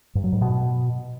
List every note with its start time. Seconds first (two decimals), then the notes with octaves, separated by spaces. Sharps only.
0.15 G2
0.24 F#3
0.32 G#2
0.41 B2